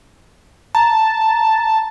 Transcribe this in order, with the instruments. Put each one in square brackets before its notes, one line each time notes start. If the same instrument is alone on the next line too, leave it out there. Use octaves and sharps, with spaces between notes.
[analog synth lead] A5 [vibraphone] A#5